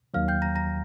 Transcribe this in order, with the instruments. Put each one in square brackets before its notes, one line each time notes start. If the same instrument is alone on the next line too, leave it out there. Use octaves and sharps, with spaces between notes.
[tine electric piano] D#2 D#3 F#3 [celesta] F5 F6
[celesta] G5 G6
A#5 A#6
A#5 A#6